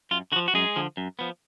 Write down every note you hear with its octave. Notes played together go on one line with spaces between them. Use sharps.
F#2 F4
D3 F#4
F3
F#4
F#2 G#3 G#4
D3 F3
F#2
F3 B3